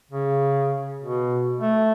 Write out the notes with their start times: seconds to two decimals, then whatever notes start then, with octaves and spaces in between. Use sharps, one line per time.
0.11 C#3
1.01 B2
1.60 A3